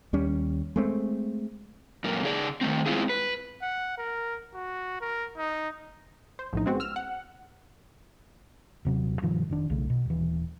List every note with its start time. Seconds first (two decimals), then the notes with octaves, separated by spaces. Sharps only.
0.13 D#2 G3 C#4
0.76 G#3 A3 C4
2.04 F#2 A#2 A#3
2.23 C#3 G#4 D5
2.61 D#3 A3 C4
2.86 G#3 B3 C4 E4 F4 G#4
3.09 B4
3.62 F#5
3.98 A#4
4.54 F#4
5.01 A#4
5.37 D#4
6.39 C5
6.53 A#1 A2 D#4
6.66 G#3 B3 C4 F#4
6.80 E6 F6
6.96 F#5
8.85 D#1 C3 F#3
9.22 G2 B2 D#3 F3
9.49 F1 D#3 D4
9.70 B1 C#3 A3
9.90 B2
10.06 D#1 E3